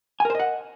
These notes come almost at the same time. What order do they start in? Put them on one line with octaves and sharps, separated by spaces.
G#5 A#4 C5 D#5 F#5